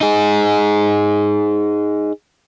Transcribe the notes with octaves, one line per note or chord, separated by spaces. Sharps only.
D#4 G#4